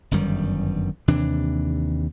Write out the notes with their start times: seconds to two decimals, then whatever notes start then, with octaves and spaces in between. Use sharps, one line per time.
0.11 G1 F#2 D#3 G3
1.08 D#2 C3 E3 D4